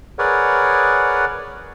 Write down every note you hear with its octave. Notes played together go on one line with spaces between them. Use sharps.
G#4 A#4 B4 C#5 D5 F#5